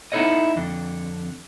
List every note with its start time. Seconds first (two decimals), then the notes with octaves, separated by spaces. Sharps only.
0.12 B3 D#4 E4 A4 C#5 D#5
0.56 F2 D3